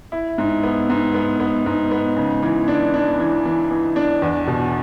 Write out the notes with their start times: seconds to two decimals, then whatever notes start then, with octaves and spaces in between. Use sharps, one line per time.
0.12 E4
0.38 G#2
0.63 B3
0.90 G#2
1.14 B3
1.40 B3
1.66 G#2
1.91 B3
2.17 C#3
2.42 E3
2.68 D4
2.94 D4
3.19 E3
3.45 E3
3.71 E3
3.96 D4
4.22 E2
4.47 B2